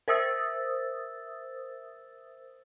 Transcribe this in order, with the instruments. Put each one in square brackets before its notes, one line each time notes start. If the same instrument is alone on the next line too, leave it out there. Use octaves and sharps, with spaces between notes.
[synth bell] A#4 C5 E5 D#6 E6 A6